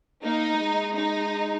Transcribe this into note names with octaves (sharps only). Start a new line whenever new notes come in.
A#3 D#4
G#3
D#4